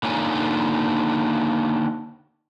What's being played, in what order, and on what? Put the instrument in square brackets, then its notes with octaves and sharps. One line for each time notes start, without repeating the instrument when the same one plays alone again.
[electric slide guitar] D3 A#3 D#4 F4 C#5 G#5